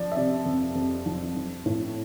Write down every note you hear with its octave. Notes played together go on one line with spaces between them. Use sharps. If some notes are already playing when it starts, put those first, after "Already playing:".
Already playing: F3 D5
E5
C3 D5
F2
F2
F3
F3
A2